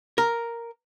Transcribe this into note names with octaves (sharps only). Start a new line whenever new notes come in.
A#4